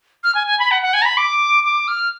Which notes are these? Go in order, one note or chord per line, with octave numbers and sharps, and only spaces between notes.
F6
G#5
G#5
B5
F#5
F#5
G#5
A#5
B5
D6
D6
F6